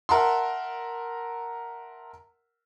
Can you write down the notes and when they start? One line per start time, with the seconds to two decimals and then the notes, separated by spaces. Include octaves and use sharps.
0.09 A#4 E5 F#5 A5 C6